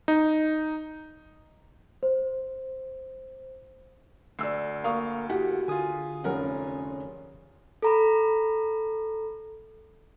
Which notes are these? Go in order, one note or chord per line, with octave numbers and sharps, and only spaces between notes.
D#4
C5
D2 D5 E6 C7
A#3 A#4 F5 C#6 D#6
E4 F#4 G4 F#5
D3 F4 G#4 G#5 D#6
F1 C#4 A#4 F#5
A4 A#5 B5